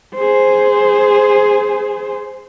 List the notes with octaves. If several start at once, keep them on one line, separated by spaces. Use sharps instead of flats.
G#4 C5